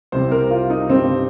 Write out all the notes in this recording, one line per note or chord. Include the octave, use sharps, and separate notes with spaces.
C2 C3 G3 C5
A#4
F4
D#4
G2 G3 C4